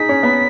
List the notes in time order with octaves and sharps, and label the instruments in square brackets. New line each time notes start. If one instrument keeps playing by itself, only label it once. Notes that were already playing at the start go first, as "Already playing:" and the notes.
Already playing: [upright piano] D#4 G#4 [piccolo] B6
[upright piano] C#4
B3